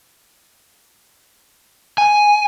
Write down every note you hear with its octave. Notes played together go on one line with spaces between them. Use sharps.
G#5